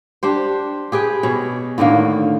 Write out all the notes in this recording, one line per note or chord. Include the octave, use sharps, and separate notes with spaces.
D4 G4 C5
G4 G#4 B4 G5
B2 G#4 C#5
A2 D3 D#3 A#3